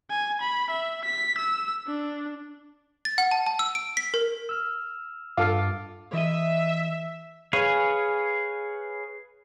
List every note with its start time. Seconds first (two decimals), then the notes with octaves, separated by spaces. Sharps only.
0.10 G#5
0.41 B5
0.70 E5
1.05 B6
1.38 E6
1.87 D4
3.05 A6
3.18 F#5
3.31 A5
3.46 A5
3.59 E6
3.75 D7
3.97 B6
4.14 A#4
4.49 E6 F6
5.37 G2 F4 A4 F5 D6
6.13 E3 D#5 E5
7.53 G#4 B4 C#5 F5 G#5